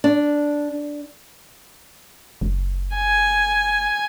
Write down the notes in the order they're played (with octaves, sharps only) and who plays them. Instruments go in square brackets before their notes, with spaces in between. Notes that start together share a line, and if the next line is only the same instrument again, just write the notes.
[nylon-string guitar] D4
[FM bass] F#1
[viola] G#5